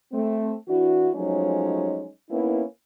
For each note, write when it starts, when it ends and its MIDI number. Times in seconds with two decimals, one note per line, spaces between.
0.13 0.53 57
0.13 0.53 60
0.69 1.10 52
0.69 1.10 62
0.69 1.10 64
0.69 1.10 66
1.15 2.08 53
1.15 2.08 54
1.15 2.08 56
1.15 2.08 57
1.15 2.08 61
1.15 2.08 63
2.30 2.63 58
2.30 2.63 59
2.30 2.63 61
2.30 2.63 63
2.30 2.63 64